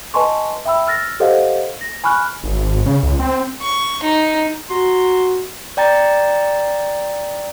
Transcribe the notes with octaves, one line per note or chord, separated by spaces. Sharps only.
B4 D#5 G#5 A5 C6 C#6
E5 G5 B5 E6
E6 F6 A6 A#6
G4 A4 C5 D#5 F5 F#5
A#6
G#5 B5 C#6 F6 F#6
G#1
C#3
C#2
C4
C#6
D#4
F#4 A#5 C6
D5 G5 A#5 A6